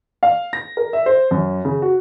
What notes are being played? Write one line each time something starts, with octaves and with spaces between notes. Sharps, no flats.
F5
A#6
A#4
E5
C5
F#2
C#3
F#4